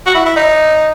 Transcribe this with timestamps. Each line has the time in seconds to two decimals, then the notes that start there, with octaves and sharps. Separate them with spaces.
0.06 F#4
0.15 E4
0.25 E4
0.36 D#4